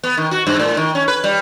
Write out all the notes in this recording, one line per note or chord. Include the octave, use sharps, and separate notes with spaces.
B3
D#3
F#4
G2
A2
D#3
C#4
B4
G3